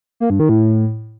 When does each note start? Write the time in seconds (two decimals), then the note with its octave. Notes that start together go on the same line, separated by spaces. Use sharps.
0.20 A#3
0.30 G2
0.40 D#3
0.49 A2